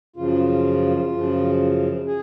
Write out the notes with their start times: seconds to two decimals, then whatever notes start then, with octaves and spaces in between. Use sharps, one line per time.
0.16 F#2 C#3 F3 F4
1.12 F#2 C#3 F3
2.06 G#4